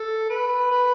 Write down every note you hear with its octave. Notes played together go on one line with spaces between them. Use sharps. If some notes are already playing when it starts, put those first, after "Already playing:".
Already playing: A4
B4
B4